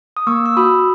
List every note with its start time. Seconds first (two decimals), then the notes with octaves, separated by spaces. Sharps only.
0.17 D#6
0.27 A#3 C#6 E6
0.46 E6
0.57 F#4 B5 D#6